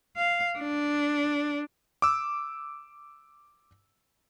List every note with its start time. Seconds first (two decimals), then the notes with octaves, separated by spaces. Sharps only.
0.17 F5
0.59 D4
2.02 D6 E6